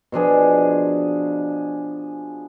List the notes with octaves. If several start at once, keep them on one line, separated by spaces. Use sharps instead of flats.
B2 F3 D4 G#4